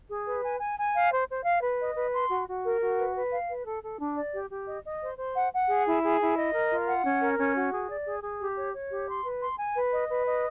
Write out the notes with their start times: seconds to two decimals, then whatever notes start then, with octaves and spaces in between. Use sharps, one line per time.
0.09 G#4
0.26 B4
0.43 G#5
0.60 G#5
0.77 G#5
0.94 F5
1.11 C5
1.28 C5
1.44 F5
1.61 B4
1.79 D#5
1.95 B4
2.13 C6
2.29 F#4
2.47 F#4
2.64 A#4
2.81 F#4
2.98 B4
3.15 B4
3.31 F5
3.48 B4
3.66 A4
3.82 A4
3.99 D4
4.16 D5
4.33 G4
4.51 G4
4.67 D#5
4.83 D#5
5.01 C5
5.17 C5
5.34 F#5
5.52 F#5
5.68 G#4
5.85 E4
6.03 G#4
6.20 E4
6.37 D#5
6.53 A#4
6.70 F4
6.88 F#5
7.04 C#4
7.21 A#4
7.38 C#4
7.55 F#4
7.72 G#4
7.89 D5
8.06 G#4
8.22 G#4
8.39 G4
8.56 C#5
8.73 C#5
8.91 G4
9.08 C6
9.24 B4
9.42 C6
9.58 G#5
9.75 B4
9.93 D#5
10.09 B4
10.26 D#5